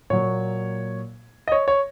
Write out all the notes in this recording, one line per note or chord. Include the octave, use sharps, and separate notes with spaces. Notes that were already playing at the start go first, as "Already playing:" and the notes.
A#2 F#3 A#3 C#5
D#5
C#5
C#5